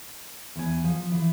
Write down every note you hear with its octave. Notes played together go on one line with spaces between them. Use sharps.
E2 G#5
F3
E3